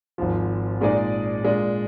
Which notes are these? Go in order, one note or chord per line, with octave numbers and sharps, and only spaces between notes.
G#1 G#2 F3
A#2 G#3 D#4 G#4 D5
A#2 G#3 D4